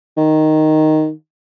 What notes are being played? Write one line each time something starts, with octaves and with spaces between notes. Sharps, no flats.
D#3